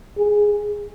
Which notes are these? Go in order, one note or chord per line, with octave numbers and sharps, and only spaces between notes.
G#4